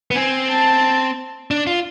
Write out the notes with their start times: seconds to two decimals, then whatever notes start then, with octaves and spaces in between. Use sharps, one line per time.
0.11 B3
0.16 C4 G#5
0.50 A5
1.51 D4
1.67 F4